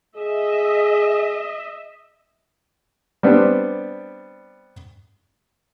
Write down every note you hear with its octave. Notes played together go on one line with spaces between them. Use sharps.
G#4 D#5 E5
G3 B3 C4 D4